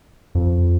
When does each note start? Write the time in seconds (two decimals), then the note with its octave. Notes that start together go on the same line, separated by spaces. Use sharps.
0.35 F2